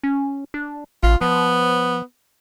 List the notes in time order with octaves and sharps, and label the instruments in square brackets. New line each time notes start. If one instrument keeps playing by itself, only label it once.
[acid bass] C#4
D4
[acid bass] A1 [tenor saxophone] F4
[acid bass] F3 [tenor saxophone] B3